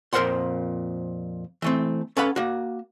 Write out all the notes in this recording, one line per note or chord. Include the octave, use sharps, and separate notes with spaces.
F2 A#2 A#4 C5 F#5 C6
E3 A3 C4
C#4 A4 B4 F5 F#5 B5
A#3 F#4